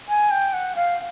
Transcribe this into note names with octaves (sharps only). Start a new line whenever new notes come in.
G#5
G5
F#5
F5